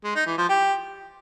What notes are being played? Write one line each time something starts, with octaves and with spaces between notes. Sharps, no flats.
G#3
D#4
E3
F3
G4